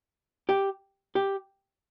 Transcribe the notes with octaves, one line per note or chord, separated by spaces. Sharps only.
G4
G4